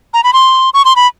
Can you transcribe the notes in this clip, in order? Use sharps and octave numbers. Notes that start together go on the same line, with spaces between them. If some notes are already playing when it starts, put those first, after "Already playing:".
A#5
B5
C6
C#6
C6
B5